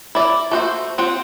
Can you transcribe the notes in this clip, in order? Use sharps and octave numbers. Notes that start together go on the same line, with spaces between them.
E4 D5
A3 F#4 C5
C4 F4 F#5